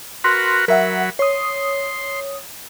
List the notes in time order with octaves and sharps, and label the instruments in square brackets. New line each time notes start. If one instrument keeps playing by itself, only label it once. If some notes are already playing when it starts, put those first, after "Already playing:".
[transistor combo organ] F#4 A#4 B4 [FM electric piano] C6
[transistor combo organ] F#3 B5 [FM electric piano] A#4 E5 F#5
[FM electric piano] C#5 D#6 [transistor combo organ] C6